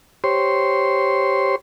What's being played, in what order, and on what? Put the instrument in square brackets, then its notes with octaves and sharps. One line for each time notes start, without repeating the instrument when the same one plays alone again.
[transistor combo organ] G4 C5 C#5 C6